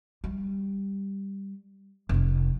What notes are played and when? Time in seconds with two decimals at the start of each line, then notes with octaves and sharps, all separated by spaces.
0.24 G3
2.09 F1 F2